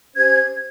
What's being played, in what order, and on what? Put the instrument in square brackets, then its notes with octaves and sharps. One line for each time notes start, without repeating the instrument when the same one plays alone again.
[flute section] C#4 G4 C5 G#6